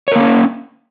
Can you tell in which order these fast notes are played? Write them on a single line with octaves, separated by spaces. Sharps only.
C#5 A#4 A#3 C#4